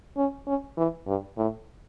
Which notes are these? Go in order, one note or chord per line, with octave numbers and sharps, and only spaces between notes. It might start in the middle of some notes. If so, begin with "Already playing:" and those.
C#4
C#4
E3
G2
A2